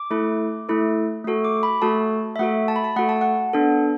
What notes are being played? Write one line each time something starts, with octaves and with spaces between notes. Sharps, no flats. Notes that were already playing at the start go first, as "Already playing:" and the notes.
Already playing: D6
A3 E4 A4
A3 E4 A4
A3 F#4 A4
D6
B5
A3 F#4 A4 A5
E5
A3 F#4 A4 F#5
A5
B5
A5
A3 F#4 A4 F#5
A5
F#5
B3 D4 A4